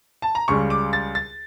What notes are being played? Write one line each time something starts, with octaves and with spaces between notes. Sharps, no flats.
A5
A#5
C#2 C#3 G3 C#6
D6
A6
A6